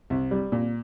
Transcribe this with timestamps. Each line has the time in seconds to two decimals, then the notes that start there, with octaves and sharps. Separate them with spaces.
0.10 C2
0.31 G3
0.52 A#2